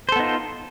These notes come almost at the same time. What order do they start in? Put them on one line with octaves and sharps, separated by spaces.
C5 A4 B3 D#4 F4